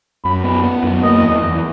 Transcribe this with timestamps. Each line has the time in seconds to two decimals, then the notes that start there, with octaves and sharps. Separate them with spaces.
0.24 F#2 B5
0.44 B3
0.64 B3
0.83 F#2
1.03 A#3 D#5
1.23 E2
1.43 E2